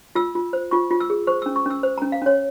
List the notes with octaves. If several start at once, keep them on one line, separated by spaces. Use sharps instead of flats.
F4 E6
F4
C5
F4 C#6
F4
E6
G#4
C5 C#6
C#4 E6
C#6
C#4 E6
C5
C#4 A#5
F5
C#4 C#5